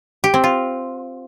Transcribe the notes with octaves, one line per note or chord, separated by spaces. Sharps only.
G4
C4
F4